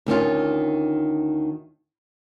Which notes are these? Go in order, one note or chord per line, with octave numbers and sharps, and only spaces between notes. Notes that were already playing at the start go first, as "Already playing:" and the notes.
D2 D#3 C#4 F4